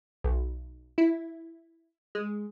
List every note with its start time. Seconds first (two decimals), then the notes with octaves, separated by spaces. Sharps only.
0.24 B1
0.98 E4
2.15 G#3